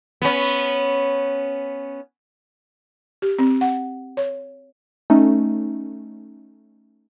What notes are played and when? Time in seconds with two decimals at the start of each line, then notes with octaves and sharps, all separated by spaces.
0.22 B3 C#4
3.22 G4
3.39 C4
3.61 F#5
4.17 C#5
5.10 A3 C#4 D#4